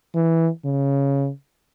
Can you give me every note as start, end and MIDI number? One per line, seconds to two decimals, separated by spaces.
0.15 0.48 52
0.65 1.30 49